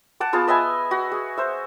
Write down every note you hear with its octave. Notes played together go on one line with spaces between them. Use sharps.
F#5 A5 D6
B3 F4 G#4 A5
B4 D#5 E5 G#5
F#4
G#4
C5 E5